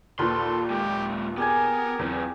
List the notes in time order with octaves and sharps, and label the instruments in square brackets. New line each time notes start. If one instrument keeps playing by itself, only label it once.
[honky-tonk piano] D#2 A#2 [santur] F4 B4 B5 [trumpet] A4 [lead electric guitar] C6
[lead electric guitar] G#3 A#3 [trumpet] G4
[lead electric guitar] B3 [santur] G4 G#4 G#5 [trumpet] A#4
[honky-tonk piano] E2 [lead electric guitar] F#3 C4